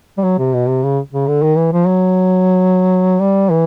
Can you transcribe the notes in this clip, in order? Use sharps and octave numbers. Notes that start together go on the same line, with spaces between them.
G3
F#3
C3
B2
C3
C#3
C#3
D3
D#3
E3
F3
F#3
G3
E3